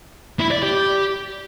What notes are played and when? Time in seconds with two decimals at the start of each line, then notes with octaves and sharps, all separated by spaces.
0.40 E4
0.51 D5
0.63 G4